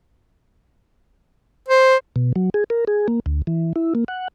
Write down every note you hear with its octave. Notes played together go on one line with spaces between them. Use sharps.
C5
B2
F#3
G#4
A#4
G#4
A#3
D2
E3
E4
A#3
F#5